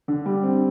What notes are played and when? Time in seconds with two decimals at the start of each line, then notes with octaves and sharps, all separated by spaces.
0.08 D3
0.26 G3
0.43 C4